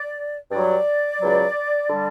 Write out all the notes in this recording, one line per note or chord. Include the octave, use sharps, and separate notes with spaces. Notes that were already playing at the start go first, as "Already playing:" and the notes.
Already playing: D5
G2 F#3 D5
C#2 B2 F#3
D3 G3